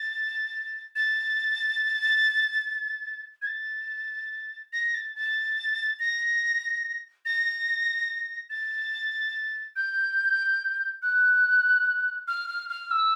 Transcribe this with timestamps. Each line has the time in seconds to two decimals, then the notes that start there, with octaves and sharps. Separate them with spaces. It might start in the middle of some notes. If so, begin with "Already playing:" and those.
Already playing: A6
0.95 A6
3.42 G#6
3.47 A6
4.72 A#6
4.94 A6
5.15 A6
5.99 A#6
7.25 A#6
8.50 A6
9.76 G6
11.02 F#6
12.27 F6
12.48 F6
12.69 F6
12.91 E6